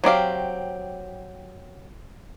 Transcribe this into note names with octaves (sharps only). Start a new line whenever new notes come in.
F#3 C4 G4 F5